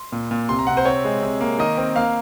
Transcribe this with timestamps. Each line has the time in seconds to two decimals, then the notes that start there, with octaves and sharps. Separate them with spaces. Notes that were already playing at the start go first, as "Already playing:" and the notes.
Already playing: C6
0.12 A#2
0.31 A#2
0.49 C3 C6
0.59 A#5
0.67 C3 F#5
0.77 C5
0.85 C4 C#5
1.05 G#3
1.22 C3
1.41 A#3
1.58 D#3 D#5
1.77 C4
1.96 A#3 F5